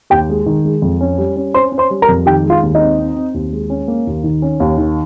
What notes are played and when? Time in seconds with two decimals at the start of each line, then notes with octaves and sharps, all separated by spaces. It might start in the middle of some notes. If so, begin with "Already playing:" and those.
0.10 D#2 G4 G5
0.29 G#3
0.46 D#3
0.65 G#3
0.82 F2
1.01 C#4
1.18 G3
1.36 C#4
1.54 C#4 C5 C6
1.72 C#4
1.78 C5 C6
1.91 G3
2.02 A#4 A#5
2.08 F2
2.26 D#3 G4 G5
2.44 G#3
2.50 F4 F5
2.63 D#2
2.75 D#4 D#5
2.80 C4
2.99 C4
3.16 C4
3.34 D#2
3.53 G#3
3.70 C#4
3.88 A#3
4.07 D#2
4.24 D#3
4.42 C#4
4.60 D#2
4.77 D#3